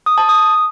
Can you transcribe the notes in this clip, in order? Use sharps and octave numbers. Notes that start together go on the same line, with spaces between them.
D#6
A5
D#6